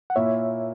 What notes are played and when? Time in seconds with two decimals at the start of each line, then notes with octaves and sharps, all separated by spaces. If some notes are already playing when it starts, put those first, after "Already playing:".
0.10 F#5
0.16 A#2 A#3 E4 C#5 E5